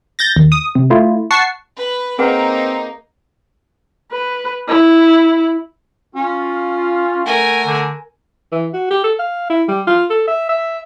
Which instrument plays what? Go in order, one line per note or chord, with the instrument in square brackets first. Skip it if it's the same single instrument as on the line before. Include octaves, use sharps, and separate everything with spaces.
[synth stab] G6 A6 A#6
D#2
D#6
C3
A3 E4 F4
F#5 A5 C#6 C7
[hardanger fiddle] B4 B5
[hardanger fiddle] A#3 D#4 [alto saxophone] C4 [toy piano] G#4 B4 F#5
[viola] B4
E4
[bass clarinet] C#4 [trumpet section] F4
[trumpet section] A3 F#5 [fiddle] A#4 G#5
[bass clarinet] D3
[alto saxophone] E3
F#4
G4
A4
F5
E4
G3
F4
A4
E5
E5